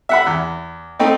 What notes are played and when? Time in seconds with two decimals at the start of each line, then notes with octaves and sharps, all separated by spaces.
0.09 E5 F#5 B5
0.26 E2
0.99 A3 C4 D#4